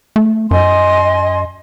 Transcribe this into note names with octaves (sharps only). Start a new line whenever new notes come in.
A3
F#2 D#5 G#5 C6